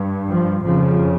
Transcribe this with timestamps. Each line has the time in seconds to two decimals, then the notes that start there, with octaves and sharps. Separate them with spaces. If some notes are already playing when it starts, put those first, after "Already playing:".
Already playing: G2
0.29 F3
0.65 F2 C#3 F3